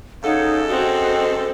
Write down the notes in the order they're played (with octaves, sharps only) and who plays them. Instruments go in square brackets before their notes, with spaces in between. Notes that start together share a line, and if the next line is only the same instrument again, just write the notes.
[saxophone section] F#2 G#3 A4 [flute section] D#4 C#5 F#5 [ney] F5
[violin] C4 [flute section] F#4 [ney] D#5